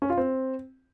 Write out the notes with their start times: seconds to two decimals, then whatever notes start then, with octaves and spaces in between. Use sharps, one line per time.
0.02 C#4
0.10 F4
0.18 C4